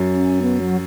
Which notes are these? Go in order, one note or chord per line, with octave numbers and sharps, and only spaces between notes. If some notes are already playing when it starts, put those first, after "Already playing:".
Already playing: F#2
C#4
B3
F#3